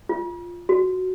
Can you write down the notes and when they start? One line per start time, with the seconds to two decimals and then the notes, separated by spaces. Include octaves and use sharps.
0.09 F4
0.69 F#4